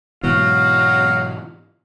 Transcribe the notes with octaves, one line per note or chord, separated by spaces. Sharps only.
G#2 B2 E3 F#3 F5